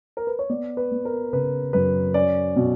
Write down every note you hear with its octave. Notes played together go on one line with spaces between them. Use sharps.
A#4
B4
C#5
B3 D5
B4
B3
A#4
C#3 B4
F#2 B4
C#4 D5
B2